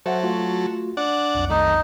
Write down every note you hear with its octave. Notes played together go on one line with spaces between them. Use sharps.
F#3 A4 C5 E5 F#5
A3 F4 F#4
D4 D5 F#5
B1 F2
D#3 A3 D#4